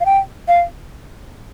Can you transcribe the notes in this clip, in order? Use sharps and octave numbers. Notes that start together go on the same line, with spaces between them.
F5
G5
F5